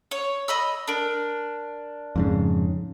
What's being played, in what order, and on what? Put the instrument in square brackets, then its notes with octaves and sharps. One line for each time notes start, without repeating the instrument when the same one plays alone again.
[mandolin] C#5
D#5 B5 E6
D4 A#4
[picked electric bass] F2 G#2 C#3